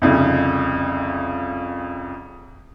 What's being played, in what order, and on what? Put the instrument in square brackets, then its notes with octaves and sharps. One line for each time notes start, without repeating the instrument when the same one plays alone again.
[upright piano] C2 F2 C#3